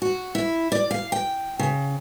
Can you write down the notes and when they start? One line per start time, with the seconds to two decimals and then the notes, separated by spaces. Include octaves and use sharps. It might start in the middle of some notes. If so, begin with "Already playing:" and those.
0.02 F#4
0.35 E4
0.72 D5
0.91 F5
1.12 G5
1.59 C#3